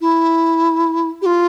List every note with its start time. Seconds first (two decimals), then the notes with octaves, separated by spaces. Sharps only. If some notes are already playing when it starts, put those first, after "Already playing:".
0.01 E4
1.22 G4
1.26 F4